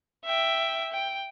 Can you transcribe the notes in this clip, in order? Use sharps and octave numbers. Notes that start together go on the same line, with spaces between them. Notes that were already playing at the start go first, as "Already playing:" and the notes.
E5 G5
G5